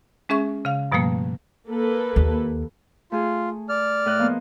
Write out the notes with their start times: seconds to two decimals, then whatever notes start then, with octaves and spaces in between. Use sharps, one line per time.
0.29 G#3 C#4 G#4 E5 C#6
0.65 C#3 F5
0.92 G2 B2 F3 G3 A3 A#3
1.67 A#3 A4 B4
2.16 D#2
3.12 A3 F4 G#4
3.69 D5 F6
4.06 A2 D#5 F#6
4.18 F3 A#3 B3